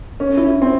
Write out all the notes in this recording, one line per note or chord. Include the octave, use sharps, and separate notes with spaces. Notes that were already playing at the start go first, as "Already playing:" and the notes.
C#4
E4
C4